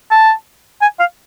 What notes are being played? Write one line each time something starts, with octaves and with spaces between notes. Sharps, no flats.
A5
G#5
F5